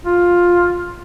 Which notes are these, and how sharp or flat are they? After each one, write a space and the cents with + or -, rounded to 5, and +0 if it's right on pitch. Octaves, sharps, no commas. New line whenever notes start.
F4 +10